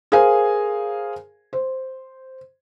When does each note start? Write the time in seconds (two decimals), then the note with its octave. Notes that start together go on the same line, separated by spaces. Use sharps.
0.12 G#4 A#4 C5 F5 G#5
1.53 C5